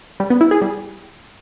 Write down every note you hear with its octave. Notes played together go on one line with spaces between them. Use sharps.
G3
B3
E4
G#4
G3